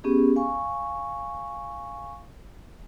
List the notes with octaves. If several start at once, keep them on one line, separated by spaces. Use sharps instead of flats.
B3 C#4 G4 G#4
F5 G#5 C#6